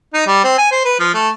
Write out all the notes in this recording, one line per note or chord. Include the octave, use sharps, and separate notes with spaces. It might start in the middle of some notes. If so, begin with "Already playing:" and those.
D#4
G3
C4
G#5
C5
B4
F3
A3